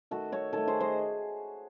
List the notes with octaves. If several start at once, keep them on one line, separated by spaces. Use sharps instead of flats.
D#3 A3 F#4 A4
A4 C#5
D#3 A3 A4 C#5
G#4 C5
C5 D#5